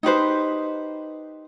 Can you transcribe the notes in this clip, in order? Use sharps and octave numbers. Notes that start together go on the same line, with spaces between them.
D#4 G4 B4 C5